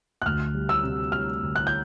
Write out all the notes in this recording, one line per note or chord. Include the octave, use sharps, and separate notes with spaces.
F#6
D2 F6
G3
E6
C3
G3 F6
D2
F#6
G6